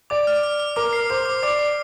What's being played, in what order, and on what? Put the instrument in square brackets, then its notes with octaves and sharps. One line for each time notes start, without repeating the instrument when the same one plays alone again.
[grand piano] D5 [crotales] D6
[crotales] F6
F6
F6
[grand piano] A#4 [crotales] D6
[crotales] C7
[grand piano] C5 [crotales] D6
[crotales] D6
[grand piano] D5 [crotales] D6
[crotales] D6